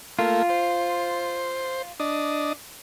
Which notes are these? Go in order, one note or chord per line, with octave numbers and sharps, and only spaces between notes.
A3 A#3 F4
C5
D4 D#5